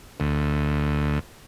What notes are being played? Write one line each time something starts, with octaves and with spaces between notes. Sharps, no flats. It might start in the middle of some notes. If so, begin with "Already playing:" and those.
D2